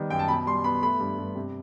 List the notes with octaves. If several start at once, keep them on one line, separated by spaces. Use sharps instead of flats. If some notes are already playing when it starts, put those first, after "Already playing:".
Already playing: D#3 G3 B3
F#2 G5
A5
B2 B5
G3 C6
B3 B5
A3 B5
G2
G2
C3